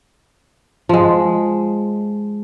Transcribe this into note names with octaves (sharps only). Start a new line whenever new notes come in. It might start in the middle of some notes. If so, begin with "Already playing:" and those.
F3 G#3